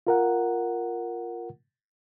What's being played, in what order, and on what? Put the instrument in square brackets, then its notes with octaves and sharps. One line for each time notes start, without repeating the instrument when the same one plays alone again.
[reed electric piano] F4 A#4 F#5